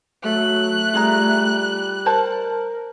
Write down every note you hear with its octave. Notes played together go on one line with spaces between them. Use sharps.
F#3 A3 F#6
G3 F4 G#4 A#5
A#4 C5 A5